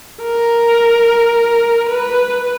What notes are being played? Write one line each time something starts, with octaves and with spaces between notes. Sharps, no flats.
A#4
B4